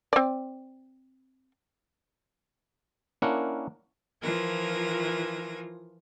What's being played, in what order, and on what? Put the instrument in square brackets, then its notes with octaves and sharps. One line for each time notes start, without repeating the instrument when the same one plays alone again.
[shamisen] C4 D5
[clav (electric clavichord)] A#3 C#4 D4 E4 A#4 F#5
[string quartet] E3 F3 F4 A#4 G#6 A#6